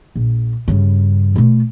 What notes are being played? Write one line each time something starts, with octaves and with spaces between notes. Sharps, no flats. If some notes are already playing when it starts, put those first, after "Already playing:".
A#1
G2 C#3
B2 A3